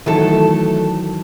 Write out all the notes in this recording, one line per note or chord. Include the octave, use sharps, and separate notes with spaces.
D#3 E3 F#3 A3 A4